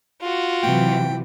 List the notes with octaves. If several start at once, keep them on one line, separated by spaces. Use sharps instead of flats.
F4 F#4
C3 E3 F#3 G5